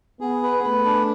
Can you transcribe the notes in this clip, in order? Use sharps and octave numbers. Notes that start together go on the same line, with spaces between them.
B3 G#4
B4
A3 B4
D4